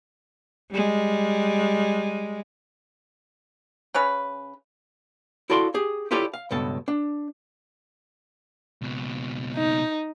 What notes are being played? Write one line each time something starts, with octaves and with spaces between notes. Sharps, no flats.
G3 G#3
C#3 C#4 B4
E4 F#4 A4 D5 F5 C6
G4 G#4
E4 F4 G4 A4 C#5 D5
F5
C#2 G2 B2 A4 A5
D4
C#2 B2
D#4